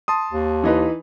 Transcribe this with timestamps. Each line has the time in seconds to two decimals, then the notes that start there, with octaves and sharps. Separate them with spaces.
0.08 A5 C6 D#6
0.31 D#2
0.63 E3 D#4 B4